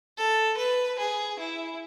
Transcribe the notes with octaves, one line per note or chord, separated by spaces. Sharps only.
A4
B4
G#4
E4